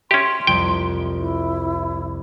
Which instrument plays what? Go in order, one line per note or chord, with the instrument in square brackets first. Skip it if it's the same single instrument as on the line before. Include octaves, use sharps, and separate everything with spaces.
[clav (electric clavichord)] C#4 G4 [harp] E5 [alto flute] C6
[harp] C2 F2 [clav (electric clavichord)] G5
[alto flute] E4